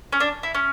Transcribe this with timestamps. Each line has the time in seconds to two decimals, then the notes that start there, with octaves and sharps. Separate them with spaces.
0.12 C#4
0.20 D4
0.43 E4
0.55 C#4